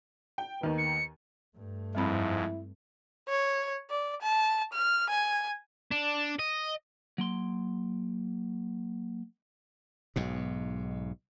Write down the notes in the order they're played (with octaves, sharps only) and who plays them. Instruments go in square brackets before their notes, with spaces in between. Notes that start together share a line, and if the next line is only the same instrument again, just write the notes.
[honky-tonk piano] G5
D#2 D#3 B3
[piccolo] C#7
[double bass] G2 A3
[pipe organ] F2 G#2 [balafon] G3 C4 B5 [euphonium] E4
[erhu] C#5
D5
A5
F6
G#5
[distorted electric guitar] D4
D#5
[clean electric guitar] F#3 A#3 C6
[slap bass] B1 G#2 B2